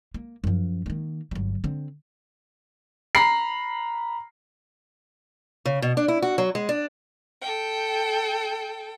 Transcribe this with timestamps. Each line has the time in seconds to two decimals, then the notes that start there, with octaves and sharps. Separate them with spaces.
0.14 A#3
0.44 F#2 F3
0.86 D#3 A#3
1.31 G1 F#3
1.64 D3 C4
3.15 A#5 B5 C7
5.65 C#3
5.82 B2
5.97 D4
6.08 E4
6.22 F#4
6.38 F#3
6.55 G#3
6.69 D4
7.42 A4 G5